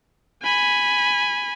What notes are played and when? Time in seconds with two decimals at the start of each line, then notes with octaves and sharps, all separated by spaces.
0.42 G#5 B5